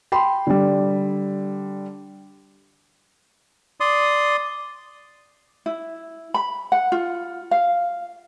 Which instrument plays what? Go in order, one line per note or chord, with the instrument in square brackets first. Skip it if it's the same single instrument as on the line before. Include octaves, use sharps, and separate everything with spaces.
[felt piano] G5 B5 C6
D3 G3
[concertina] D5 C6 D#6
[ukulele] E4
B5
F#5
F4
F5